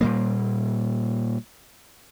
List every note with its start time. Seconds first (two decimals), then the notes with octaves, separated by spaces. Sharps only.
0.01 A#2 G3 A#3